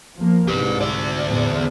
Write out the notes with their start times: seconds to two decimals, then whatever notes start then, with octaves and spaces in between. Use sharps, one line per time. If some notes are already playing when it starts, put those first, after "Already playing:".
0.15 F3 A#3
0.48 C2 G#2 G4 B4
0.81 D2 D5
1.27 E2 A2